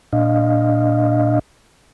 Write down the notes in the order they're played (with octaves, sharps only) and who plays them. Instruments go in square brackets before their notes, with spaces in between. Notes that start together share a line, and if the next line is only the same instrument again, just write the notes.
[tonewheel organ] A#2 D4 D#5 F5